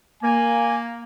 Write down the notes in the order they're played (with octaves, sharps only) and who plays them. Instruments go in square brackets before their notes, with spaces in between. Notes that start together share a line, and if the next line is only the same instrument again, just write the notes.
[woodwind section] A#3 [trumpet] G#5